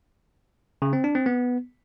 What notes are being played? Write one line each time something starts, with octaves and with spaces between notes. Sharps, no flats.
C#3
C4
D4
C4
B3